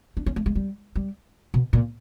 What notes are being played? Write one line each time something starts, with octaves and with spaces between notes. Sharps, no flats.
D4
C#4
A3
G#3
G3
G3
B2
A#2